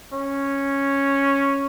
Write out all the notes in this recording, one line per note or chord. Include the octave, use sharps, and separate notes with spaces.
C#4